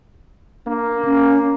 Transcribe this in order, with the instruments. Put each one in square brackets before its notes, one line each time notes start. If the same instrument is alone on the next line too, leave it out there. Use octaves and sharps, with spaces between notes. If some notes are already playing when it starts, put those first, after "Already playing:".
[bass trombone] A#3 [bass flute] D4
[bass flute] C#4